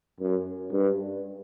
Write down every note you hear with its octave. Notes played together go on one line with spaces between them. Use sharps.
F#2
G2